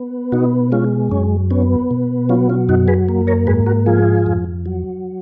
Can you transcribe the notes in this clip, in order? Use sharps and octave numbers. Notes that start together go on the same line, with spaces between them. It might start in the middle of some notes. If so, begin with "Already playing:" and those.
Already playing: B3
B2 D#4 F#4
G#3 C#4 F4
F#2 C#4
B3 C#4
B2
F#3 C#4 F4
C#4 F4
F#2 D#4 F#4
G#4 B4
A#3
A#4 C#5
G#2 G#4 B4
F#4 A#4
F3 F4 G#4
F2
F#3